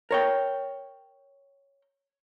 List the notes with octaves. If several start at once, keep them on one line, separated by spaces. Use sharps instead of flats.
A#4 C#5 G5